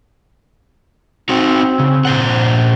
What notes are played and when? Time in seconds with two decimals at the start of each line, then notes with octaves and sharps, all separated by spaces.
1.29 C4 D#4 F#4
1.80 C#3
2.05 A#2 C5 F#5